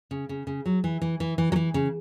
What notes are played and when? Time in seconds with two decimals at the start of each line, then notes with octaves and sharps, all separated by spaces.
0.11 C#3
0.29 C#3
0.47 C#3
0.66 F#3
0.84 E3
1.02 E3
1.20 E3
1.38 E3
1.52 F#3
1.56 E3
1.74 C#3